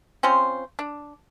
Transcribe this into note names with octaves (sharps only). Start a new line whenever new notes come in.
C4 C#4 F4 C5
D4